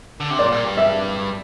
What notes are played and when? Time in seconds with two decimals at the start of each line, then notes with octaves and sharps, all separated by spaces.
0.20 D3
0.30 C3
0.39 A#2 D5
0.52 A#2
0.65 G2
0.77 E5